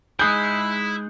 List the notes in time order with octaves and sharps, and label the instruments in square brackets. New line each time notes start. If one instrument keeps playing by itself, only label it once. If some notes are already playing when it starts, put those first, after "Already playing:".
[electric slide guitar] G#3 D#4 G#4 [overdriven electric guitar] E4 [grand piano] D#6 F#6 G6